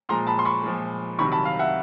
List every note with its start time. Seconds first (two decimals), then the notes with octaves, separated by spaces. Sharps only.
0.09 A#2 F3 G#3 A#5 C6
0.27 A5 B5
0.39 C6
0.45 B5 C#6
0.63 A#2 F3 G#3
1.18 C2 C3 D#3 F#3 B5 C#6
1.32 A5 B5
1.45 F5
1.59 E5 F#5